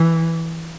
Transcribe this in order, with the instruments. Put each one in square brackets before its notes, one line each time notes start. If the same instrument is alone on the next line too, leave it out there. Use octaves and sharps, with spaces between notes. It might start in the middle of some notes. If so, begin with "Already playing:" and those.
Already playing: [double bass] E3